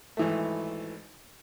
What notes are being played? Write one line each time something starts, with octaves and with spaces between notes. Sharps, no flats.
G#1 E3 A3